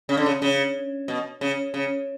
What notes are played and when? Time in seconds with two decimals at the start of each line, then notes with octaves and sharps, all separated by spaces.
0.09 C#3
0.17 D3
0.26 C#3
0.42 C#3
1.08 B2
1.41 C#3
1.74 C#3